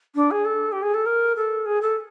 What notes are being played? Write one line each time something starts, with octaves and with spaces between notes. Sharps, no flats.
D4
G#4
A4
G4
G#4
A4
A#4
A4
G#4
A4